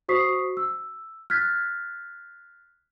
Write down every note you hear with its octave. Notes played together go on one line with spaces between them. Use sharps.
F#4 C5 C#6 D#6 B6 C7
E6
F6 F#6 G#6 A6 B6